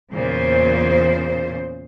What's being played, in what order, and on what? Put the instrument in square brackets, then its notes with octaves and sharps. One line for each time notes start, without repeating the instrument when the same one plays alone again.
[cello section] E2 A#2 C#3 C5